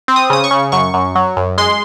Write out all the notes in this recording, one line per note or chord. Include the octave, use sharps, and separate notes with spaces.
C4
D#6
C#3 D#6
C#6
C#3
F#2 C#6
F#2
F#3
F#2
G#3 C6